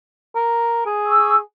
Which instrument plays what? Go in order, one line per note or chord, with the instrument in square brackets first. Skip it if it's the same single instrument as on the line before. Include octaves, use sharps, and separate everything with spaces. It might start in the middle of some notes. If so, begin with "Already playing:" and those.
[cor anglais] A#4
G#4
[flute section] C#6 E6